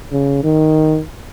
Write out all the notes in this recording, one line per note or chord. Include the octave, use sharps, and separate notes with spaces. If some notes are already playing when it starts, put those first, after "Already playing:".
C#3
D#3